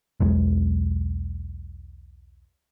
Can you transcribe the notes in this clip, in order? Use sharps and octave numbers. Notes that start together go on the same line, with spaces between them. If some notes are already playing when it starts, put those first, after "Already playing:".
B1 E2 G#3